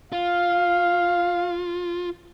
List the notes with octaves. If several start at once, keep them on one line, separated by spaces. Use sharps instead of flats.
F4 F5